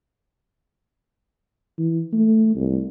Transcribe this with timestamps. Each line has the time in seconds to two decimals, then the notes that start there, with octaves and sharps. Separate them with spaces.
1.78 E3
2.13 A3
2.56 C2